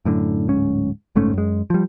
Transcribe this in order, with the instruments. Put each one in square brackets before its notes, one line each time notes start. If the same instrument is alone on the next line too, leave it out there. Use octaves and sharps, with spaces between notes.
[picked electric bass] F#2 A2 D3
D1 G#2 C#4
F#1 G#2 A3 C#4
F#2 G#3
F3 G3